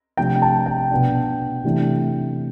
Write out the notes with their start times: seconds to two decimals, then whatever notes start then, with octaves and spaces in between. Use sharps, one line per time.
0.17 C3 F3 A3 D4 G5
0.42 A5
0.66 G5
0.91 B2 B3 D4
1.64 C3 E3 A3 D4